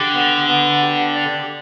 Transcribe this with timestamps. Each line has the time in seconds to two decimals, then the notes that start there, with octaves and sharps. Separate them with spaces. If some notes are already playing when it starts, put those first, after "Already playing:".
Already playing: D3 G4
0.14 B3
0.49 B3
0.83 G4
1.16 D5